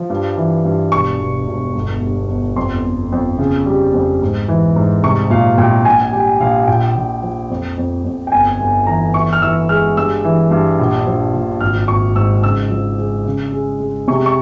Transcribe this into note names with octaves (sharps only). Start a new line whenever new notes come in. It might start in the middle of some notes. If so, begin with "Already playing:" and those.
Already playing: F3
G2
E3
G2
E1 C#6
E1
E1
G1
G2
G1
F2 C6
G1
F2
C#3
G3
F2
G#2
E3
G#2
C2 C#6
A#2 F5
A#2 G5
A#1 G#5
G3 G5
A#1 F5
A#2 G5
A#1
F3
F2
F2
F2
G5
G1 G#5
G1
E3 A#5
E3 C#6
F6
E3 E6
G#3 F6
G2 E6
E3
G2
A#1
F3
A#1
G#1 F6
G#1 C#6
G#2 E6
C#3 E6
F3
G#3
C#3
G#3
G#3
C3 C#6
C#6